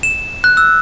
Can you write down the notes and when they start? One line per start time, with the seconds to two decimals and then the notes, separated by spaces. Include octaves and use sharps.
0.03 E7
0.44 F#6
0.57 E6